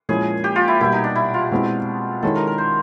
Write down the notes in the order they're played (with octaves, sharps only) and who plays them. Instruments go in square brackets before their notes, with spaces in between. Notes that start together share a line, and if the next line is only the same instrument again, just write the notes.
[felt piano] A#2 F3 G#3 C#4 E4 [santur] G#4
[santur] G4
F4
E4
[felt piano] B2 G3 A#3 [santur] E4
[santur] D#4
D4
E4
F4
[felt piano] B2 G#3 C4 E4
[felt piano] D#3 G#3 C#4 E4 [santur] A4
[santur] A#4
A#4
C5